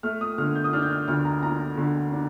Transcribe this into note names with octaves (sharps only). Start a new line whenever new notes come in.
A3 F6
D#6
D3 F6
G6
D#6
D4 F6
G6
F6
D2 F6
A#5
D4 A#5
D3
D4